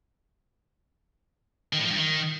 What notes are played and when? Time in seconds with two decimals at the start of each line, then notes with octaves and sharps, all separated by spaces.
1.73 D#3
1.79 A2
1.85 F3
1.91 G2
1.97 D#3